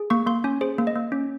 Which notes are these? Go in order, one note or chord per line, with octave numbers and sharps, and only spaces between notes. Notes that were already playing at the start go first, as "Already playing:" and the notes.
Already playing: G#4
A#3 C#6
A#3 C6
C#4 G#5
G#4 C5
A#3
D#5
A#3
C#4